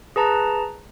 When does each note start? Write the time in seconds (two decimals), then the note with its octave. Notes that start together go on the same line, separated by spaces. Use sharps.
0.16 G#4 B4 A5 A#5